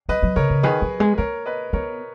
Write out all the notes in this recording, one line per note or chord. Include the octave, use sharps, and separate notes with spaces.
F#3 B4 D#5
F#3
C#3 A#4 C#5
C#3
D#3 G#4 B4
F#3
G#3
A#3 A#4 C#5
B4 D#5
B3 A#4 C#5